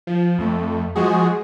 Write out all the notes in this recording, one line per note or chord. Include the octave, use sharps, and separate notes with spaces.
F3
F2 A3
F3 G#3 F#4 G#4